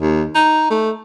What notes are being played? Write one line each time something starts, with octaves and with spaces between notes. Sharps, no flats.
D#2
D#4
A3